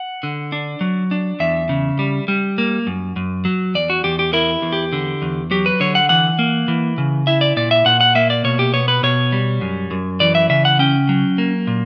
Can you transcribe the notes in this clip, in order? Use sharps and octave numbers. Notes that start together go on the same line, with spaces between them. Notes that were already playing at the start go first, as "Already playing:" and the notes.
Already playing: F#5
D3
D4
F#3
D4
E2 E5
C#3
G3
G3
A#3
F#2
F#2
F#3
E2 D5
F#4
E2 G4
G4
E4 A#4
E2
G4
D3
E2
F#3 G4
B4
D3 C#5
F#5
E3 F#5
A#3
E3
C#3
E4 E5
D5
A#2 D5
E5
A#2 F#5
F#5
A#3 E5
D5
B2 C#5
G4
B3 C#5
B4
B2 C#5
G3
F#2
F#2
E3 D5
E5
C#3 E5
F#5
C#4 G5
F#3
A#3
A#2